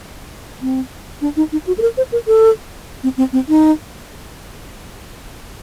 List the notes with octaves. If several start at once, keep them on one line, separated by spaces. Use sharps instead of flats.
C4
D4
D#4
D#4
F#4
A4
A#4
C5
A#4
A4
C4
C4
C4
D#4